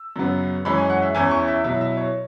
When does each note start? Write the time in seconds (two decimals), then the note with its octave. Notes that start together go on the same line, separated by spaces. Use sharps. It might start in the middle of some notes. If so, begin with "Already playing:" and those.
Already playing: E6
0.16 F#2 C#3 F#3 B3
0.65 F#2 E3 G#3 C#4 B5
0.77 G#5
0.90 F#5
1.02 E5
1.15 E2 E3 C#4 E4 G#5
1.31 C#6
1.48 E5
1.64 B2 F#3 E4 E5
1.81 E5
1.97 C#5